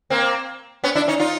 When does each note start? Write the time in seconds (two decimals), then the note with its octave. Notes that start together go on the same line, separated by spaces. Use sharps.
0.10 A#3 C4
0.84 B3 C#4
0.95 D4 E4
1.08 C#4 D#4
1.20 D#4 F4